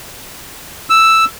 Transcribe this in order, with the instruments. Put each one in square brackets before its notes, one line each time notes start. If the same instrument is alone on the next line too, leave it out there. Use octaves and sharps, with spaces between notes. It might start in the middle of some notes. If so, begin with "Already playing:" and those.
[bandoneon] E6